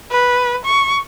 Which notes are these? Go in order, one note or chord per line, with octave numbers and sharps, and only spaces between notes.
B4
C#6